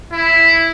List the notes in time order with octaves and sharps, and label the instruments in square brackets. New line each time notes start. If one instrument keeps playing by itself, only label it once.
[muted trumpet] E4